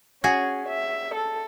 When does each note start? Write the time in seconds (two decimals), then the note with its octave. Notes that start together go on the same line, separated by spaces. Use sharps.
0.24 C#4 F#4 G#4
0.69 E5
1.15 A4